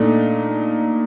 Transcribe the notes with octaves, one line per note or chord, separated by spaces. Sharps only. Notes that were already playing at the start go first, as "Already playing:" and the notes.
Already playing: A#2 A3 D4 D#4